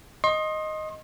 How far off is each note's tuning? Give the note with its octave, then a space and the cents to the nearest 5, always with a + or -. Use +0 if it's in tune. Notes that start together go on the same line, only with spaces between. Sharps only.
D#5 +0 C6 +35